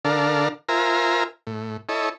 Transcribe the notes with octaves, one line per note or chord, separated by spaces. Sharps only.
D3 D4 A4 A#4 F5
F4 A#4 C5 E5 G#5 A#5
A2
E4 A4 C#5 D#5